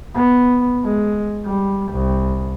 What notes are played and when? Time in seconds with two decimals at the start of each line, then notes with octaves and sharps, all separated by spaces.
0.15 B3
0.85 G#3
1.45 G3
1.92 C2